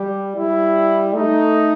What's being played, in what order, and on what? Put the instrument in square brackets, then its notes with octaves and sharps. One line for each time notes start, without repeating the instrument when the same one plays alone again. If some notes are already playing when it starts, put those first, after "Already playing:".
Already playing: [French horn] G3 [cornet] G4
[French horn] G3 [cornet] E4
[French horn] A3 [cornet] D#4